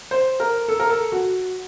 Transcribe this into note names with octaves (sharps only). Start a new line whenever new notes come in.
C5
A#4
A4
A#4
A4
F#4